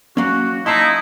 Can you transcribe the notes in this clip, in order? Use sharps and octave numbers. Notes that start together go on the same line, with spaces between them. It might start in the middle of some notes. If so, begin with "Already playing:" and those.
F#3 A#3 C#4 F#4
D#4 E4 D#5 F5 A5 C6